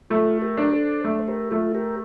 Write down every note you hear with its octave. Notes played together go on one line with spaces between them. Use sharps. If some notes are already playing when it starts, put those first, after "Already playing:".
A3 F4 A4
G4 A#4
D4
A4 C5
A3
C5
G4 A#4
A3 F4 A4
G4 A#4